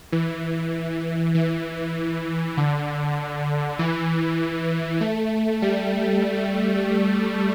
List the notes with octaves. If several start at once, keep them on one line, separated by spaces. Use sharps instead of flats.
E3
E3
D3
E3
A3
G3